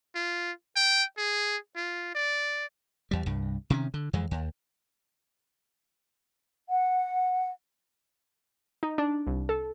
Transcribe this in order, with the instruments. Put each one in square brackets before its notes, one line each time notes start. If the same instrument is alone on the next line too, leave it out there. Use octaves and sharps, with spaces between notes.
[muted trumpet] F4
G5
G#4
F4
D5
[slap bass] E2 G3
C2 G2
C3 D#3 C#4
D3
F2 E3 G#3
D#2
[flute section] F#5
[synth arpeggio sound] D#4
D4
C2
A4